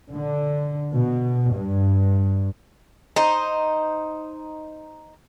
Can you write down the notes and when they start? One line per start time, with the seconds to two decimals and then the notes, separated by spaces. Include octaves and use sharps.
0.13 D3
0.95 B2
1.53 G2
3.16 D#4 C5